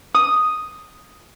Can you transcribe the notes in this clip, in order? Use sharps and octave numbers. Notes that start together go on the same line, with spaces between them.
D#6